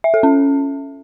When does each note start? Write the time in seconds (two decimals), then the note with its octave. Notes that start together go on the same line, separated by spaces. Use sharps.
0.04 E5
0.14 A4
0.23 C#4